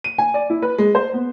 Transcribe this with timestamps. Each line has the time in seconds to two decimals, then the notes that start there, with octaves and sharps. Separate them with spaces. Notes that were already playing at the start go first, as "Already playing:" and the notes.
0.04 D#7
0.18 G#5
0.34 D5
0.50 E4
0.62 B4
0.78 G#3
0.95 C5
1.13 B3